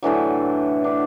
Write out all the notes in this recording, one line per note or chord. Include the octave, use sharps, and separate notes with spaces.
A2 D3 E3 F#3
D4 B4